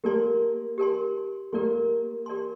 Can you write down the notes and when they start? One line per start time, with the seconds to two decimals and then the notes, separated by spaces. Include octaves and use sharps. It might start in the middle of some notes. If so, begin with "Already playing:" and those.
0.04 A#3 G4 A#4 D5 A5 C6
0.78 G4 A#4 D5 A5 C6
1.53 A#3 G4 A#4 D5 A5 C6
2.26 G4 A#4 D5 A5 C6